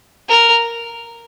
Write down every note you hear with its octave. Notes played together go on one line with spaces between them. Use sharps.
A#4